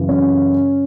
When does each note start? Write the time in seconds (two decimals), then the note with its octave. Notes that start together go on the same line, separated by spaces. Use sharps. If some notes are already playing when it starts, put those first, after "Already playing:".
Already playing: F#2 C#3 E3
0.09 C#4